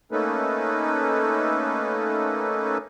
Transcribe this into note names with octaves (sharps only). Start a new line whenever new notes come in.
A3 A#3 C#4 D#4 A4 B4